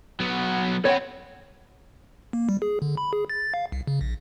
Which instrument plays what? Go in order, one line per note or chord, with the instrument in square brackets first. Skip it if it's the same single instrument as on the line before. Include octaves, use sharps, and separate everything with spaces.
[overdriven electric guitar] F#3 B3
[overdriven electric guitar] B3 C4 [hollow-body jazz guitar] C#5 F#5
[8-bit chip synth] A#3
G3
G#4
D3
B5
G#4
A6
F5
C2
C#3
A#1